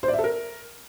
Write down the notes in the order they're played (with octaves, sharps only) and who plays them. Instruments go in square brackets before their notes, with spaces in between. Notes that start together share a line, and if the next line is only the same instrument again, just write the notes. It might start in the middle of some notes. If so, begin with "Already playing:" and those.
[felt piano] C5
D5
E5
A4
A#4